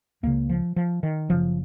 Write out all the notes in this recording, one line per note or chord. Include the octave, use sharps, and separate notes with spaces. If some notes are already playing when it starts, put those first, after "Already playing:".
C#2 C#3 A#3
F3
F3
D#3
F#1 F#2 C#3 F3